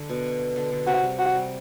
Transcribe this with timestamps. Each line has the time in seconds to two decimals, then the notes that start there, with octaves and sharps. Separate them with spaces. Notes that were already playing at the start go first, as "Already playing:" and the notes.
Already playing: D3
0.09 B2
0.56 D3
0.72 D3
0.87 C3 F#4
1.03 G3
1.19 F#4
1.35 G3